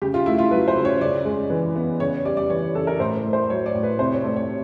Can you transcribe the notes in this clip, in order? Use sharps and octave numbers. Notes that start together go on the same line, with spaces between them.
C#3 G4
F4
A3 E4
F4
F#3 B4
C5
C#3
C#5
C#3 D5
G#3
E3
B3
C#3 C#5
G3 D5
D5
E3 C#5
C#3 A4
A#4
A2 C5
A3
C5
F#3 C#5
D5
A2
B4
C3 C5
C#5
A3 D5
C#5